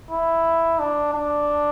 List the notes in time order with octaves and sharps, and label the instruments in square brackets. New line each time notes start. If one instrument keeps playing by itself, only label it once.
[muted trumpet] E4
D4
D4